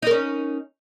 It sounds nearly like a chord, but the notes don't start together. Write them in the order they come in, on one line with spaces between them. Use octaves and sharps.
D#4 A#4 C#4